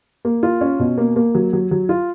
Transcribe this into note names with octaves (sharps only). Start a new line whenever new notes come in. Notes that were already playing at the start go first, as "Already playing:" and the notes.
A#3
F4
C#4
B2
A#3
A#3
F#3
F#3
F#3
F4